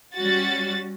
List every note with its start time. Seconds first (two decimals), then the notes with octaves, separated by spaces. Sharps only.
0.16 G3 C#4 F#4 A6